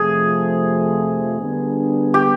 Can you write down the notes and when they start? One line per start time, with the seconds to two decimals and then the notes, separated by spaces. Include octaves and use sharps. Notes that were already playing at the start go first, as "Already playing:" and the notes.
Already playing: F2 C3 F3 A3 G#4
1.39 D3 G3 B3 D4
2.14 G4